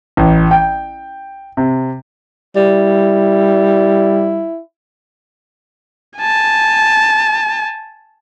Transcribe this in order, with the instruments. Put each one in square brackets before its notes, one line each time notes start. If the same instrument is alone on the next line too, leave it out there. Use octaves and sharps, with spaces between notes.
[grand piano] A1
G5
C3
[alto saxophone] G3 [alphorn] E4
[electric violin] G#5 A5